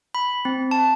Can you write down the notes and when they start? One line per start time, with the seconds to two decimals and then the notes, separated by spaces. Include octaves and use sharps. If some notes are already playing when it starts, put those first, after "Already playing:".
0.15 B5
0.45 C4
0.71 A5